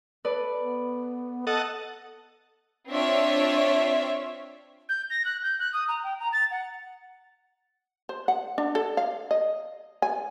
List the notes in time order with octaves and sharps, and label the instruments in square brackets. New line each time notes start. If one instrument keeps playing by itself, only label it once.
[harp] A4 B4 D5
[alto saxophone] B3
[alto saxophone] A4 [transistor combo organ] D#5 F#5 A5
[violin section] C4 D4 F4 C#5 D5 E5
[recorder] G6
A#6
F#6
G6
F#6
D#6
A#5
G5
A#5
A6
F#5
[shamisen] C5
F#5
D4
A4
F5
D#5
G#5